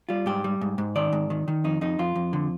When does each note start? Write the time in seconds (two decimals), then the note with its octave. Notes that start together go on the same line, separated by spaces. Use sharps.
0.09 G3 F4
0.26 G#2 G4
0.44 G3
0.61 G#2
0.78 G#2
0.95 D#3 D5
1.13 G#2
1.30 D#3
1.48 D#3
1.64 F2 D#4
1.81 F2 D#4
1.99 F2 F4
2.15 F2
2.33 D3